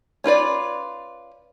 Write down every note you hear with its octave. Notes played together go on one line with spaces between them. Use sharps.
C#4 F4 B4 D5